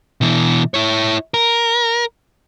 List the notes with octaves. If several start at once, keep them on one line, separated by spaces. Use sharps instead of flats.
B2 E3
E4 C#5
A#4